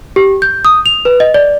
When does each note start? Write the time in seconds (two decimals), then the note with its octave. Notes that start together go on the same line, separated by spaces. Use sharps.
0.16 G4
0.42 G6
0.65 D#6
0.86 F7
1.05 B4
1.20 D#5
1.34 D5